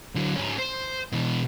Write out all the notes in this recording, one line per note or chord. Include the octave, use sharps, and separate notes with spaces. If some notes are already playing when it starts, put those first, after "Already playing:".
D3 F#3
G#2 C#4
C5
B2 E3